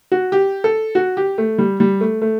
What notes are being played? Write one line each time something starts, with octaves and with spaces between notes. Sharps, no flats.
F#4
G4
A4
F#4
G4
A3
G3
G3
A3
A3